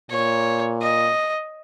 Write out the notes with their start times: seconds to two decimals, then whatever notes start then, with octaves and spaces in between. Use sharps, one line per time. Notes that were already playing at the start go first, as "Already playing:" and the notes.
0.10 A#2 C#5
0.82 D#5